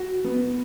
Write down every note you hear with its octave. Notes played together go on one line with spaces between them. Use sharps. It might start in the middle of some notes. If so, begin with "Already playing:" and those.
Already playing: F#4
B3